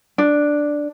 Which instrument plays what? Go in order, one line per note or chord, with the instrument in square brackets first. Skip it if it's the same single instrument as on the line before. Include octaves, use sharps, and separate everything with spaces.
[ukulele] D4